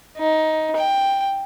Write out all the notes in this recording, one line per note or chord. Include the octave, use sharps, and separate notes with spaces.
D#4
G5